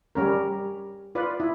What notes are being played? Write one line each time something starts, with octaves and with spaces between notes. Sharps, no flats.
G3 C#4 A#4
F4 B4 D5
E4